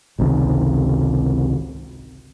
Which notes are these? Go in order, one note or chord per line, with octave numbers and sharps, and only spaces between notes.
G#1 C#2 C3 D#3